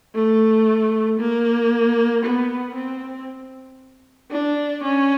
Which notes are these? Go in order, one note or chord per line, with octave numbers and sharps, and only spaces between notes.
A3
A#3
B3
C4
D4
C#4